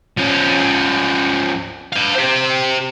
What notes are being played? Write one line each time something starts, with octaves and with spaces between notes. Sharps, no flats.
F3 C#4
B4 F5
G4 C5